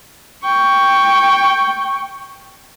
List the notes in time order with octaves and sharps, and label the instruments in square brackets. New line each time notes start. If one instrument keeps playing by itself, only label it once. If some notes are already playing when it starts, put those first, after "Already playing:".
[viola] G5 C#6